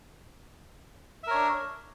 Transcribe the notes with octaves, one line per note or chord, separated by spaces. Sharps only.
D4 A#4 C#5 E5